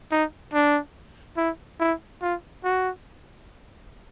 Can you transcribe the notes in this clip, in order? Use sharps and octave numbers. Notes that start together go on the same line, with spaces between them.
D#4
D4
E4
E4
F4
F#4